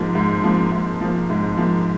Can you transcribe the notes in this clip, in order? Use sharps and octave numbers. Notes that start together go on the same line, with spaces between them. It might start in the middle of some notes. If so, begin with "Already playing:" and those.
Already playing: G#2 F3 A#3
G#2
F3 A#3
G#2
F3 A#3
G#2
F3 A#3